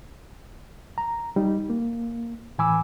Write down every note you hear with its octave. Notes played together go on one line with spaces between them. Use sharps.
A#5
G3 D#4
A#3
A2 E3 G#5 B5 D6 E6